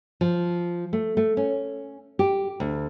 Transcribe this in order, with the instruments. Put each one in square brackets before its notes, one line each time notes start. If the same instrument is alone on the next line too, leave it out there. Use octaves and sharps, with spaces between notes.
[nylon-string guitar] F3
A3
A3
C#4
G4
D2